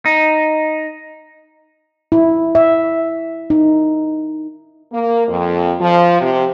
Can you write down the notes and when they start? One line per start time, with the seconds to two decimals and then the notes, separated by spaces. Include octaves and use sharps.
0.06 D#4
2.12 E4
2.55 E5
3.50 D#4
4.92 A#3
5.28 F2
5.80 F3
6.20 C3